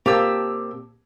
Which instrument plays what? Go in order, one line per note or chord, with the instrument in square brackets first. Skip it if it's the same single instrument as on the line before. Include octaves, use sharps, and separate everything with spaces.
[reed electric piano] A#2 A#3 C4 [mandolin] G4 A5 E6